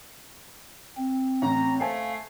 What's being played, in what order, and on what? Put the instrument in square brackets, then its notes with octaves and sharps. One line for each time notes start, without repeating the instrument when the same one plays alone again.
[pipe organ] C4
[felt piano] A1 [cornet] A#5
[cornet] A3 [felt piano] C5 G#5 A5 [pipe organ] F5